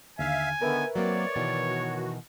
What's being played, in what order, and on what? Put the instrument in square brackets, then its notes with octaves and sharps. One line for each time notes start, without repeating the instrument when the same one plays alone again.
[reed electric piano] D#2 D3 F6 [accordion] E5 F5 [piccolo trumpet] G#5
[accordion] D3 D#3 B3 [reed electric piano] A#4 B4 E5
[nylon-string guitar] F#3 A#3 C4 [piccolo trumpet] C#5 [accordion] D5
[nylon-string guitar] B2 D#3 E3
[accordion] F#4